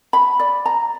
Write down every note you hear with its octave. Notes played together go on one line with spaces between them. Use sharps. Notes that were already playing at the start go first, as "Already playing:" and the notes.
B5
D5
A#5